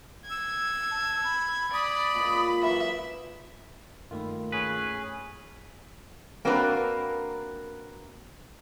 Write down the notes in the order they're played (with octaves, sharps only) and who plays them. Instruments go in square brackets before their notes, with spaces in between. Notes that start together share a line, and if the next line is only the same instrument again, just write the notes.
[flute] E6 [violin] G#6
[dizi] A5
B5
[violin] D5 [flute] B5 [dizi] D#6
[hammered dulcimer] A#2 G#3 C#4
[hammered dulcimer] E3 F#3 F4 [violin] E5
[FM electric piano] G2 A3 B5 [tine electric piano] D#3 A#3 F4
[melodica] C#4 G#4 [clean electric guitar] B4
[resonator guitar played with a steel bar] A#3 C4 D4 F#4 A#4 B4